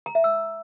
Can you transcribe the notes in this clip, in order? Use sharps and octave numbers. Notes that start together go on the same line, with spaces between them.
A#5
E5
E6